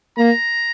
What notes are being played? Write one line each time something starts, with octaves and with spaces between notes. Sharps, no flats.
A#3 A#5